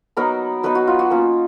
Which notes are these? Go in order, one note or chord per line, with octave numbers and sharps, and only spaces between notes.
F#3 B3 D#4 A#4
F#3 B3 D#4 B4
F#4
F4
F#4
A#3 C#4 F4